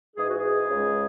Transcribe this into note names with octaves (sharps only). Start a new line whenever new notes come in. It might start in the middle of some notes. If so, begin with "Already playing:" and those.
G#2 E3 G#3 G#4
F#4
G#4
C#2 C#3 G#3